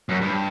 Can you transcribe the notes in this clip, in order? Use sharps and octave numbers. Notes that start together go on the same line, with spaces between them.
F#2
G2